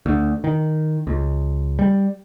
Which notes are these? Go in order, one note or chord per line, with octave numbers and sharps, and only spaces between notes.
D2
D#3
C#2
G3